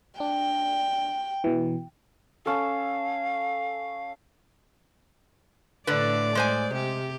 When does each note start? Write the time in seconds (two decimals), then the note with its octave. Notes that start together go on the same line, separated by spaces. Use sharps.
0.20 D4 G5
1.44 B2 E3
2.46 C#4 A4 F5
5.87 A2 D3 B4 D5
6.35 G#3 C5 G#5
6.72 C3 G4